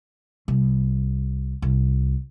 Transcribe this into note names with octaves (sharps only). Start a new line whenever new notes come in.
C2
C2